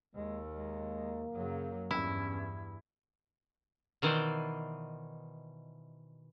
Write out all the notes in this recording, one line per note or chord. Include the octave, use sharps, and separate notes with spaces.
D#2 G#3 A#3
G#3
F#2 C#3 F#3
E2 G2 C#4 E4
B2 D#3 E3 C5 D5